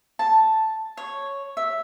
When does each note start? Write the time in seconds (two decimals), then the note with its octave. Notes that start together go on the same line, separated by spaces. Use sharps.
0.19 A5
0.97 C#5
1.57 E5